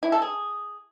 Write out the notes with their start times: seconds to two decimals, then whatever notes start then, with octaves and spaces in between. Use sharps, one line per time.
0.03 E4
0.12 A4
0.22 G#4